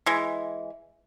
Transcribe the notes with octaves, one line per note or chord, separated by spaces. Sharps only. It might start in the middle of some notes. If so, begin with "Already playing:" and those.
E3 G#3